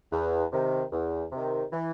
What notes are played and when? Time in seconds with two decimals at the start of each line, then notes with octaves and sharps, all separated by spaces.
0.12 E2
0.53 C3 D#3
0.92 E2
1.32 C3 D#3
1.73 E3